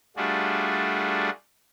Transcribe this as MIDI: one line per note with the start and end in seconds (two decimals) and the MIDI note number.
0.17 1.30 55
0.17 1.30 57
0.17 1.30 62
0.17 1.30 65
0.17 1.30 66
0.17 1.30 68